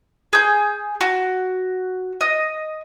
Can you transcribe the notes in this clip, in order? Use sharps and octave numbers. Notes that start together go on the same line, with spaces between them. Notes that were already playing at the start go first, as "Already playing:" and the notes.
G#4 G6
F#4
D#5